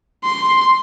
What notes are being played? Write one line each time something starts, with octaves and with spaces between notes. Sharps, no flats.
C6